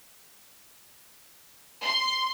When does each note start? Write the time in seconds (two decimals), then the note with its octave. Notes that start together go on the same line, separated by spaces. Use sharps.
1.83 C6